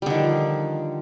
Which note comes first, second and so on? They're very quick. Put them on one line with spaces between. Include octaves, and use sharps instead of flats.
G3 D3 D#3 F3